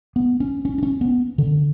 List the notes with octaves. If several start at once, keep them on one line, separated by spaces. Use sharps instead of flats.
B3
C#4
C#4
D4
C#4
B3
D3